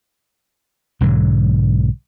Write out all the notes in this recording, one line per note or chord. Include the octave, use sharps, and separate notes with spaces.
B1 G#2 D3 F#3